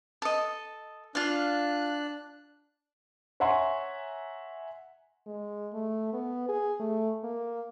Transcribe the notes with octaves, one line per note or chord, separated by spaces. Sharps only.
A4 D#5
D4 F4 F5 F#6
C#5 E5 F#5 G#5 A#5 C6
G#3
A3
B3
G#4
A3
A#3